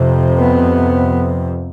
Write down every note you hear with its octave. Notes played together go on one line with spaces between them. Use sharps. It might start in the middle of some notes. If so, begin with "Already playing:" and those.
Already playing: F2 C3
B3